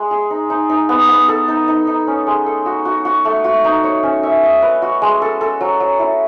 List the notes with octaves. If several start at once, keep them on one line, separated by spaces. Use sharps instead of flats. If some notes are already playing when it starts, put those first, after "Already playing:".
Already playing: G#3
G#4
D#4
D#4
D#4
B3
B3
A4
D#4
D#4
D#4
C#4
G#3
A4
F#4
F#4
F#4
A3
F#4
D#4
C#5
C#4
E5
D#5
B4
F#4
G#3
A4
A4
F#3
F#3
E4